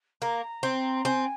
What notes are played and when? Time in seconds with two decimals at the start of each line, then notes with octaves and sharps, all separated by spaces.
0.21 A#3 A#5
0.63 C4
0.95 A#5
1.05 C4 G#5